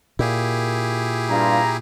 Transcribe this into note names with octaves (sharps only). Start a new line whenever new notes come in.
A#2 E4 G4 G#4
G2 F4 A#5